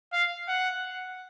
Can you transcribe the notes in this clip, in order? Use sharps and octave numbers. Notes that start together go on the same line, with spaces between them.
F5
F#5